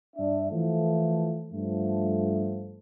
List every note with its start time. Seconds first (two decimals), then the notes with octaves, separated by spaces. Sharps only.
0.16 G2 D4 E5
0.51 E3 F3 A3
1.52 G2 F3 A3